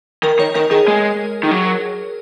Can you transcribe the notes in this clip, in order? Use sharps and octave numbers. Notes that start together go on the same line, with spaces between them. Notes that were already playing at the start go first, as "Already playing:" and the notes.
D#3 A#4
D#3 C#5
D#3 A#4
D#3 G#4
G#3
D#3
F#3